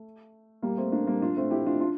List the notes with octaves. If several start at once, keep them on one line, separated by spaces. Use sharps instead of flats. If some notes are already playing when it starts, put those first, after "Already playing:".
Already playing: A3
G3 A#3
A3 C4
A#3 D4
G3 A#3
D4 F4
A3 C4
E4 G4
D4 F4
D4 F4